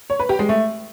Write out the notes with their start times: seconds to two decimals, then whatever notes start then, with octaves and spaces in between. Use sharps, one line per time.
0.10 C#5
0.19 B4
0.29 G4
0.39 G#3
0.49 A3